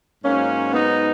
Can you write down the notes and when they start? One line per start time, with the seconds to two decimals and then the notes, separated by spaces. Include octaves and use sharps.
0.24 G#2 F#3 A#3 C#4
0.73 B3 D#4